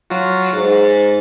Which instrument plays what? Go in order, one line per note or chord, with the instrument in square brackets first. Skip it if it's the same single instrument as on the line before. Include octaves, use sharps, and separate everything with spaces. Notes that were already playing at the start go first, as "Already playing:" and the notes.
[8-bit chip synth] F#3 F4 F#4
[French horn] G#2 [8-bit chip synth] A6